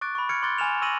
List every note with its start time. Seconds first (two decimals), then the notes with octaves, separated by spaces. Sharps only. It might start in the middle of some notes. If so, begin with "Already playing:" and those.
0.01 C#6 D6 F#6 A6 D7
0.15 B5 C#6
0.29 F6 G#6 C#7 D7
0.43 C6 D6 F#6 G#6 A6 G7
0.58 G#5 B5 F6 E7 F7
0.81 C#6 E6 A#6 D#7 F#7